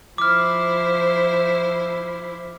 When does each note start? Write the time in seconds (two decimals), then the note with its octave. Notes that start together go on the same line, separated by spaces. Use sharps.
0.18 F3 E4 C5 D6 F6